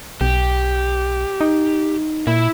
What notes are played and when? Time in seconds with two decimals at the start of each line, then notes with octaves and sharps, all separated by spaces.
0.21 B1 G4
1.41 D#4
2.27 A#2 E4